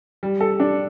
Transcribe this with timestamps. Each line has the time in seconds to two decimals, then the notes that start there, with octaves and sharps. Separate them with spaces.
0.23 G3
0.41 A4
0.60 D4